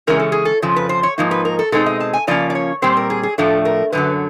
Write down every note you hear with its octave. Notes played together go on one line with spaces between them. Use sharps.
C#3 E3 G#3 C#4 A#4
A4
G#4
A4
F2 C#3 F3
B4
C5
C#5
G#2 F3 A#3 D#4
B4
A#4
A4
B2 G#3 C4 D#4 A4
D#5
A5
G#5
C#3 F3 A#3 C#4 D5
D5
C#5
A#2 G3 C4 C5
A#4
G#4
G#4
A2 F3 A3 D4 A4
A#4
F#2 D3 F#3 B4